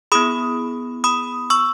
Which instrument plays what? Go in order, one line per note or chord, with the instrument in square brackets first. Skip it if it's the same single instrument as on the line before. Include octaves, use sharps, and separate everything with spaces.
[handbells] B3 E4 G#4 B5 D#6
B5 D#6
C#6 E6